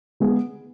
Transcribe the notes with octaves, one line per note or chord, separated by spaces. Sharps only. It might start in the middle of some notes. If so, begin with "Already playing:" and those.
G#3 B3 G#4